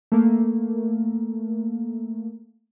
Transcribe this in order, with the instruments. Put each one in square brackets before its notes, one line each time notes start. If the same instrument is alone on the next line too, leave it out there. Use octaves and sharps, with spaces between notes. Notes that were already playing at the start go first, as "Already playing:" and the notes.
[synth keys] A3 A#3